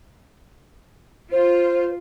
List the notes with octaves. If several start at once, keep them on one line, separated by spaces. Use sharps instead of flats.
F4 C5